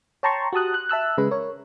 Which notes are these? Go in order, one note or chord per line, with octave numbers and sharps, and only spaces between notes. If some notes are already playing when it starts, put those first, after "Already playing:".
C#5 G5 A5 A#5 C6 C#6
F#4 G4 A5 D#6 F#6
F#6
E5 A5 E6 F#6
C#3 G#3 B4
A#4 C#5